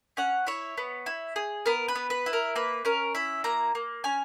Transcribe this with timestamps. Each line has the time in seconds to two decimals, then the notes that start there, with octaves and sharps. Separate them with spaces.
0.17 C#4 F#5
0.47 E4 C#5
0.78 B3
1.06 E4
1.36 G#4
1.66 B3 A#4
1.88 B4
1.95 B3
2.10 B4
2.26 E4
2.33 A#4
2.56 A#3 B4
2.85 C#4 A#4
3.15 E4 E5
3.44 A#3 A#5
3.75 A#3
4.04 C#4 G#5